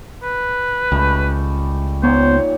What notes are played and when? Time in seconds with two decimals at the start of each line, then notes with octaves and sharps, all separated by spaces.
0.24 B4
0.92 C#2 G3 A3
2.03 A#2 D#3 B3 C5 C#5